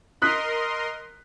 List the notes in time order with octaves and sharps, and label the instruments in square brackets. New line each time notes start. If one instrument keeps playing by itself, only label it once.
[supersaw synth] A#4 D#5 C6 [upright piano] D#6 F#6 B6